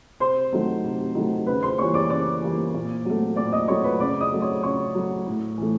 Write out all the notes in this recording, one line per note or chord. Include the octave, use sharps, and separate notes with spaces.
C3 C5 C6
D#3 F#3 A3
C3
D#3 F#3 A3
C#3 B4 B5
C5 C6
E3 G3 A#3 C#5 C#6
D5 D6
C#3 D5 D6
E3 G3 A#3
A#2
F#3 A3
A#2 D5 D6
D#5 D#6
F#3 A3 C#5 C#6
B4 B5
C#3 D5 D6
D#5 D#6
F#3 A3
C#5 C#6
C#3 C#5 C#6
F#3 A3
A2
E3 A3